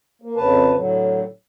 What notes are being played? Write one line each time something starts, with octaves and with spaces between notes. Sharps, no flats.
A#3
F2 C#3 B4 A5
A2 D3 F#3